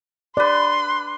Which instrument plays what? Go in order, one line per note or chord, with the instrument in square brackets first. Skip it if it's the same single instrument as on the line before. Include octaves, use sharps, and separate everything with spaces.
[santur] D4 B4 [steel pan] D5 [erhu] C6